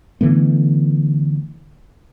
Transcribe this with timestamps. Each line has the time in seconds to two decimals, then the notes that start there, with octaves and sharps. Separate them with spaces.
0.21 D3 E3 A3 B3